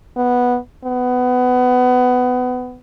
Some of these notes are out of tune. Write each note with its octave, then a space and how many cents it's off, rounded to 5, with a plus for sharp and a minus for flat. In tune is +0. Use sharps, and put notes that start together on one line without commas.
B3 -5
B3 +20